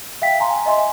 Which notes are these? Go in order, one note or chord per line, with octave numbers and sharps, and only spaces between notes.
E5 F5 G5 B6
G#5 A#5 C6
D#5 E5 G#5 C6